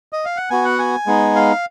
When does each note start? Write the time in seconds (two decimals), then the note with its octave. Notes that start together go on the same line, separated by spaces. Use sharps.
0.13 D#5
0.25 F5
0.37 F#5
0.50 B3 F#4 G#5
0.65 F#5
0.79 G#5
1.07 G#3 B3 D#4
1.36 F5